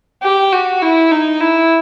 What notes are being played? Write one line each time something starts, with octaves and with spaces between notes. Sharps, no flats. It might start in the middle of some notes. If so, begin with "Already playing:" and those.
G4
F#4
E4
D#4
E4